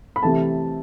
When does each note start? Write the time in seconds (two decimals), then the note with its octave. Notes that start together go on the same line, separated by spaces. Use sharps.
0.16 B5
0.23 C3 E3 A3 A5